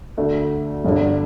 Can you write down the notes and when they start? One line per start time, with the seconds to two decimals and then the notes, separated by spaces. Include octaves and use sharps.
0.17 D2 D3 A3
0.85 G1 G2 D3